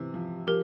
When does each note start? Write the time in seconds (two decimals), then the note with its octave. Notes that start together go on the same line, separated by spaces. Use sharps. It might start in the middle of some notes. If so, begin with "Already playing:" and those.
Already playing: C3 E3
0.14 F3
0.47 F3 G4 A#4